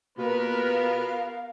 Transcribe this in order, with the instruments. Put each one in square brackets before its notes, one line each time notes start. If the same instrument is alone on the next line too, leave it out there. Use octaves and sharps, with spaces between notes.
[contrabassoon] B2 [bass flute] A#3 [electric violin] B3 A#4 [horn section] F4 G4 B4
[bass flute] F5